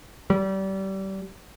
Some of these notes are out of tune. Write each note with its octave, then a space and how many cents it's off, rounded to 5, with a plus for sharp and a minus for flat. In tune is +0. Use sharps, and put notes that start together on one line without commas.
G3 -30